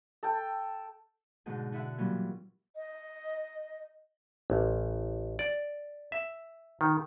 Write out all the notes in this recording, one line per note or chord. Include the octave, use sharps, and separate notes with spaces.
A4 G5
G#2 B2 D3
D3 E4 E5 F#5
A#2 E3 F#3 G3 B3 C#4
D#5
A1
D5
E5
D#3